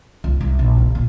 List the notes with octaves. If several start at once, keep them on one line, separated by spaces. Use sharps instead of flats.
C#2
C2
A#1
C#3
A#2